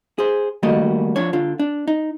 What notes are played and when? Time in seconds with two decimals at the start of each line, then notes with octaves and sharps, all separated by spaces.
0.18 G#4 C5
0.63 D#3 G3 A3 A#3 F#4 D#5
1.16 F3 D4 C#5
1.33 D3 F4
1.59 D4
1.88 D#4